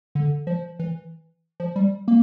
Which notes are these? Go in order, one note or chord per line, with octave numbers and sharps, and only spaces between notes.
D3
F3
E3
F3
G3
A#3